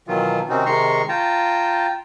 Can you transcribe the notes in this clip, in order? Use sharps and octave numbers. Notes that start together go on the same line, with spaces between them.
B2 D#3 E3 F#3 F4
C3 D#3 C4 C#4 D#4 F#4
C3 D#3 G#3 A#5 C6 C#6
F4 G5 A5 A#5